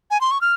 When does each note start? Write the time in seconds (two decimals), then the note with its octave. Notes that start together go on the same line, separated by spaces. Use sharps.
0.11 G#5
0.21 C6
0.31 C#6
0.41 F6